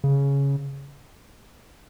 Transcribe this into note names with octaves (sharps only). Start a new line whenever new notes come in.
C#3